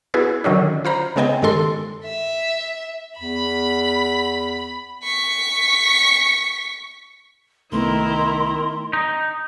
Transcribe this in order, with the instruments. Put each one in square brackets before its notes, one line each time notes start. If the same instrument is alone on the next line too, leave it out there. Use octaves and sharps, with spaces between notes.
[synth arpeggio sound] B3 E4 F#4 G#4 B4
D3 D#3 F#3 C#4 D4
F4 C5 A#5 B5
C#3 G#3 B3 D#5 G5 G#5
G2 D#3 G#3 A4 C6
[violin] E5
[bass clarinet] E2 [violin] B5
[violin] C#6 B6
[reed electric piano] C2 A3 B3 [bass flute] D#3 [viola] E4 A#4 [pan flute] C6
[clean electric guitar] D#4